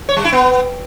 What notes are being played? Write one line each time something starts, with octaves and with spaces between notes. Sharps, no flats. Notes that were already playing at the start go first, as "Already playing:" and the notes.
C#5
G3
E4
B3